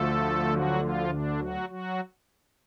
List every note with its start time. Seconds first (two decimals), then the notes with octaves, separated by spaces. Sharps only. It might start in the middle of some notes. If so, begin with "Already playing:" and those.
Already playing: D2 D3 F3 A3 A4
0.49 F#3 F#4
0.79 F3 F4
1.09 D3 D4
1.39 F#3 F#4
1.69 F#3 F#4